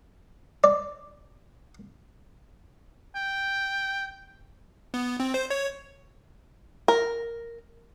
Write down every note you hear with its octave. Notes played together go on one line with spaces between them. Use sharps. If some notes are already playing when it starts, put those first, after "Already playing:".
D5
G5
B3
C4
C5
C#5
A#4